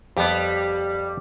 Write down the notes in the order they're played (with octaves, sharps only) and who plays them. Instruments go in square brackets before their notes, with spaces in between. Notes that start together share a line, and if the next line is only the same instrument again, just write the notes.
[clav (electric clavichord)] F2 B3 [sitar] G3